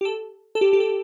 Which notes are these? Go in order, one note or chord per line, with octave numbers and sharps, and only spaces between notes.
G4
A4
A4
G4
G4
A4